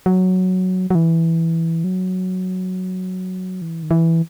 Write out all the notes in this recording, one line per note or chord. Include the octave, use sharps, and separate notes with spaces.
F#3
F#3
E3
F#3
E3
D#3
E3